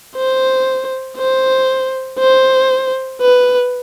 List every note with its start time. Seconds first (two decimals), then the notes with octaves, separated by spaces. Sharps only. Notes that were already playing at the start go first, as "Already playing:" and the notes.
0.16 C5
1.18 C5
2.19 C5
3.21 B4